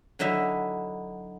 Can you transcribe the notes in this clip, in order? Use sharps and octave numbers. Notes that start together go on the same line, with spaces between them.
D3 F#3 D#4 E4 E5